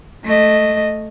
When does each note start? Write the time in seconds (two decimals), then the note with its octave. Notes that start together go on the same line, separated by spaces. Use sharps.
0.25 A3 D#5